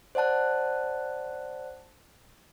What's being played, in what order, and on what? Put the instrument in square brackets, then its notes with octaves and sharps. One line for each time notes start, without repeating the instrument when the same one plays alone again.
[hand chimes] C5 D5 F#5 A5 F#6